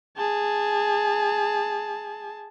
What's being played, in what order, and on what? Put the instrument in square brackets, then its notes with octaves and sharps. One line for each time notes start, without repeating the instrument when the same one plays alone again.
[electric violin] G#4 A5